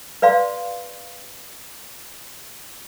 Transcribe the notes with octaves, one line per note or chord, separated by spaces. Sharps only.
B4 D5 F5 C6